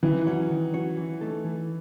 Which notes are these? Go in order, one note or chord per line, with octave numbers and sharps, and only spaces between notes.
D#3 E3
F#3 C#4 F#4 C#5
D#3
F#3 C#4 F#4 C#5
E3
A3 D#4 A4
E3